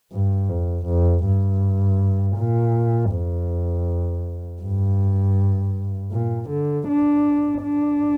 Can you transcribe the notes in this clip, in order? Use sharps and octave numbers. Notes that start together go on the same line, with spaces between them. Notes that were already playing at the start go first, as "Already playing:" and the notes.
G2
F2
F2
G2
A#2
F2
G2
A#2
D3
D4
D4